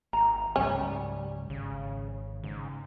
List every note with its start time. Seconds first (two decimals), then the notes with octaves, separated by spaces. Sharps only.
0.13 G#1 A#5
0.56 C#2 G#2 F#3 G3 C#4
1.50 G#1 C#3
2.44 G#2 C#3